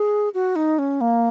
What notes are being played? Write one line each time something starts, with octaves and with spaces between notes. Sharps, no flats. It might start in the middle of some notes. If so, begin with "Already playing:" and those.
Already playing: G#4
F#4
D#4
C#4
A#3